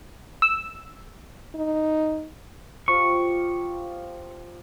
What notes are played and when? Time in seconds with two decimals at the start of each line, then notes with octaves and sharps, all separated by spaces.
0.42 E6
1.55 D#4
2.88 F3 F4 G4 C#6